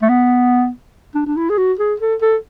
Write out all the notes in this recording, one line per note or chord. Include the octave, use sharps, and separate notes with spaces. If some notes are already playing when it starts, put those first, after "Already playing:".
A3
B3
D4
D4
E4
G#4
F#4
G#4
A4
A4